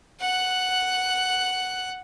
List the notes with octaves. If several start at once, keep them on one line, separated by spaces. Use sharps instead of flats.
F#5 F#6